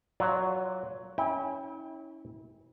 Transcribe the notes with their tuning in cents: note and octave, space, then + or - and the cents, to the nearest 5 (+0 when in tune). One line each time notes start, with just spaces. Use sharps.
F#3 +0 F4 +0 D5 -30
C#4 +0 E4 -35 G5 +15